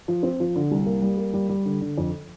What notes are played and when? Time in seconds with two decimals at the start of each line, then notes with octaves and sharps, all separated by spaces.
0.08 F3
0.23 C4
0.40 F3
0.56 D3
0.71 C2
0.86 A#3
1.02 G3
1.18 A#3
1.33 G3
1.49 G3
1.65 D3
1.81 D3
1.97 F2